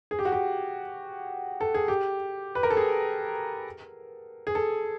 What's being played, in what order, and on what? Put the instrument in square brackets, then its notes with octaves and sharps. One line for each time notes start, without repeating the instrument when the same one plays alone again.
[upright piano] G#4
G4
F#4
G4
A4
G#4
G4
B4
A#4
A4
G#4
G#4
A4